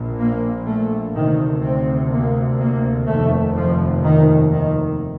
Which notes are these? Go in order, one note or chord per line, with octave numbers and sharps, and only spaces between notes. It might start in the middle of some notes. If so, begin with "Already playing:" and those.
Already playing: A#1 A#2
A#3
A3
D2 C3 D#3
C4
A#3
A#3
F1 D#2 A3
F3
D#3
D#3